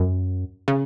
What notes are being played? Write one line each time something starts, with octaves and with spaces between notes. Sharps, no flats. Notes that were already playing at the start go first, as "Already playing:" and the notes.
Already playing: F#2
C#3